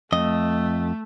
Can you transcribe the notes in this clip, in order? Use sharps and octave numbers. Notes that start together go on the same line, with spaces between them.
F2 A3 D#5